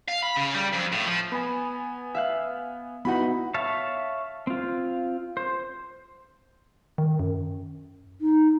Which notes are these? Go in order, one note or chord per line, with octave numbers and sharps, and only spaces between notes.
F5
B5
C#3
G3
F2
A2
F3
B3 G#5 B5
E5 F5 F#6
B3 D#4 E4 F#4 F#5 B5
C#5 E5 F5 A5
C4 F4
C5
D#3
F#2
D#4